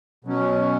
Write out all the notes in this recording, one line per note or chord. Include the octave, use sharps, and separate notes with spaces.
B2 F#3 C#4